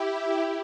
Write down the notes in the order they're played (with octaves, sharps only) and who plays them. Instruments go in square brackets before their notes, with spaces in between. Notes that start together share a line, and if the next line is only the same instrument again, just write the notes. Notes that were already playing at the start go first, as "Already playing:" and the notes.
Already playing: [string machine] E4 G4